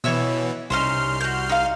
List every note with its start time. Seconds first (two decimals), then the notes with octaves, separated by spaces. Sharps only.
0.04 B2 E3 C#5 E5 E6
0.70 C2 C#4 D#4 C5 C6 F6
1.21 F#4 G6
1.49 D#4 F5